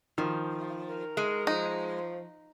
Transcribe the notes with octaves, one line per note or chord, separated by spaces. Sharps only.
D#3 F3
A#4
G#3
F3 D#4